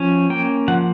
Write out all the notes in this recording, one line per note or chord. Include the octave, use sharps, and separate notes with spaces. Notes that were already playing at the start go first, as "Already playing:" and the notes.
Already playing: F3 C#4
A#3 G5
F3 F#5